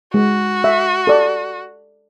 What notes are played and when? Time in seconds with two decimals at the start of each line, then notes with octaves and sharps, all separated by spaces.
0.14 G#3 F#4
0.64 E5
1.07 A4 D5